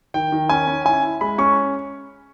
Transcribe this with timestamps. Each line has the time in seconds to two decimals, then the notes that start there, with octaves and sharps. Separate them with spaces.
0.14 D#3 G5
0.32 D#3
0.49 C#4 G#5
0.67 C#4
0.85 E4 G#5
1.03 E4
1.21 G#3 B5
1.38 C#4 C#6